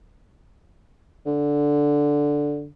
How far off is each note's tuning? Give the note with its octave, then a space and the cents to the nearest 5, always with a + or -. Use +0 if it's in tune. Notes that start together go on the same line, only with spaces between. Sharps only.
D3 -5